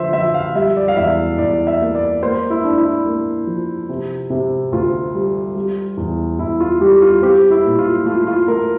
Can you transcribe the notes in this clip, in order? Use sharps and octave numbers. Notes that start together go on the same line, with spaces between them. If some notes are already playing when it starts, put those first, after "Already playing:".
Already playing: D3 F3 C5 E5
F3 E5
F5
G3 E5
D5
F5
E2 E5
E2 D5
E5
A#3
D5
A#3 C5
E4
D4
E4
A#3
F3
C3
C3
D2 F4
G3
G3
E2
E2 E4
F4
G3 G4
F4
C4 G4
E4
A#2
F4
A3 F4
F4
A3 A#4